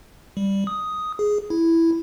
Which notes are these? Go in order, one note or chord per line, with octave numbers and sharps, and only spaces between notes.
G3
D#6
G#4
E4